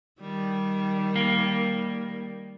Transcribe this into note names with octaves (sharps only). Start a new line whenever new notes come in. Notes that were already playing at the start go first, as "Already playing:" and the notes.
D#3 G3
A#3